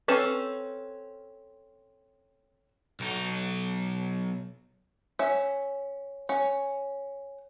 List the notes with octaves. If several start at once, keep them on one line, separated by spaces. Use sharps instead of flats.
C4 C#4 A4 B4
B1 D#4
C#4 E5
C#4